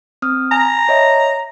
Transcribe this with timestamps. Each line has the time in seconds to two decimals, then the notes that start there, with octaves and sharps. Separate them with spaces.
0.22 C4 D#6 F6
0.52 G#5 A#5
0.89 C#5 D#5 E5